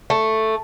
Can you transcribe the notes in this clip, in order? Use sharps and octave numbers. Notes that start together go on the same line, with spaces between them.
A3